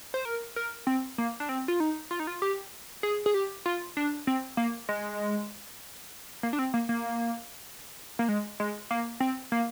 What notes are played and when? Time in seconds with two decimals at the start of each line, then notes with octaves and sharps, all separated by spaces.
0.14 C5
0.25 A#4
0.56 A#4
0.87 C4
1.18 A#3
1.40 D4
1.49 C4
1.68 F4
1.80 D#4
2.11 F4
2.20 D#4
2.27 F4
2.42 G4
3.03 G#4
3.26 G#4
3.34 G4
3.66 F4
3.97 D4
4.27 C4
4.57 A#3
4.89 G#3
6.43 A#3
6.53 D4
6.59 C4
6.74 A#3
6.89 A#3
8.19 A#3
8.28 G#3
8.60 G#3
8.91 A#3
9.20 C4
9.52 A#3